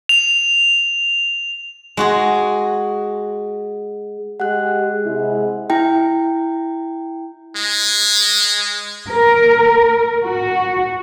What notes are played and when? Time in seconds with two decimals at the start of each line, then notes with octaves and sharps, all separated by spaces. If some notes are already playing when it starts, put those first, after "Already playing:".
0.09 F7
1.97 G#3 F#4 G#4
4.40 G#3 G4 F#5 F#6
5.06 C3 G#3 E4
5.70 E4 G5
7.56 G#3
9.10 A#4
10.26 F#4